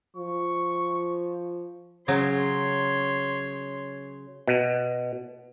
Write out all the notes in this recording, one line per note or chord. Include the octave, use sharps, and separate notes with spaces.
F3 C#6
C#3 F#3 C#5 C6
B2